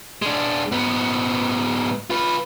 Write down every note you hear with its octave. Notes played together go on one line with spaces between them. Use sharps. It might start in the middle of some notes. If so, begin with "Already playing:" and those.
G#3 D4
G#2 B3
F4 B4